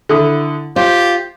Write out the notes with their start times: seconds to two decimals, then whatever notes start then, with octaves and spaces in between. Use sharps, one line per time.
0.09 D3 E4 D#6
0.76 F4 G4 C5